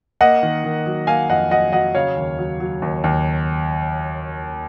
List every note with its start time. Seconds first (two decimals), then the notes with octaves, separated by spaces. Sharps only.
0.21 A#3 D#5 F#5
0.43 D#3
0.64 D#3
0.86 F#3
1.07 A#3 F5 G#5
1.29 F2 D#5 F#5
1.51 F#3 D#5 F#5
1.72 F#3 D#5 F#5
1.95 C#3 C#5 F5
2.17 D#2
2.39 F#3
2.60 F#3
2.82 D#2
3.04 D#2